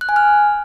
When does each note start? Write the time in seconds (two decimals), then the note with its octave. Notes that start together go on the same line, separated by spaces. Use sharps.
0.01 F#6
0.09 G#5
0.16 F6